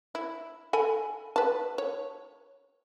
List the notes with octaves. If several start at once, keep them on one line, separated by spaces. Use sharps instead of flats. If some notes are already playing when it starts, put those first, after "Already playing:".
E4
A4 G#5 B5
B4 A5
C#5